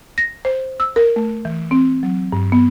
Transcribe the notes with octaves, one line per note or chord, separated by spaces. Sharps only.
A#6
C5
E6
A#4
A3
E3
C4
F#3
G2
B3